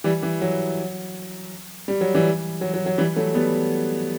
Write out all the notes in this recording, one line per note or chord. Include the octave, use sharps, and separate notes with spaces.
E3 G3
E3
F#3
G3
F#3
E3 G3
F#3
F#3
F#3
E3 G3
F#3 A3
G3 B3